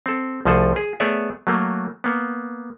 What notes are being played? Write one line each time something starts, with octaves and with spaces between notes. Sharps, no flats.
C4 A4
C2 F3 A3 G#4 A4
G#4
A3 B3 G#4 C#5 D5 E5
F#3 A3 A#3
A#3 B3